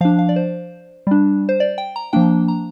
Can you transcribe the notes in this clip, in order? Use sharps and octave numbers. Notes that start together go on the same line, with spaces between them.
F3 D4 F5
F5
D5
C5
G3 D4
C5
D5
G5
A#5
F3 A#3 D4 G5
A#5